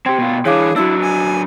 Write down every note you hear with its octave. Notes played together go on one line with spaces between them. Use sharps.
C4 G4 G5 C6 G#6
B2 F4
E3 D4 G#4 C#5 F5 D6
F#3 D4 E4 F#4 E6
G#5